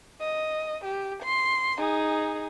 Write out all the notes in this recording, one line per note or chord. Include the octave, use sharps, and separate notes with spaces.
D#5
G4
C6
D#4 G#4